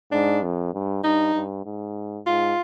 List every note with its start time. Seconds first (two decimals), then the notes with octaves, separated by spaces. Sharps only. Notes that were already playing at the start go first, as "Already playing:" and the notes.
0.12 G#2 D4
0.43 F2
0.74 G2
1.04 G2 D#4
1.34 G2
1.66 G#2
2.26 G#2 F4